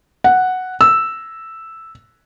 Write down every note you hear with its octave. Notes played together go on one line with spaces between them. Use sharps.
F#5
E6